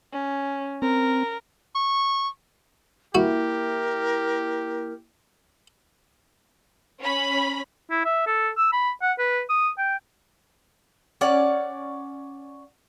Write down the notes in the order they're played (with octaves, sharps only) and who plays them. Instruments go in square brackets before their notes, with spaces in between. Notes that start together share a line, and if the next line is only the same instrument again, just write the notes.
[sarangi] C#4
[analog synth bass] C4 [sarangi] A#4
[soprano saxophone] C#6
[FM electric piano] A#3 E4 [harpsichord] F#4 [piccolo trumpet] G4 [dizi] A#4
[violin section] C#4 B5
[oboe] E4
E5
A4
E6
B5
F#5
B4
D#6
G5
[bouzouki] C#4 D5 F#5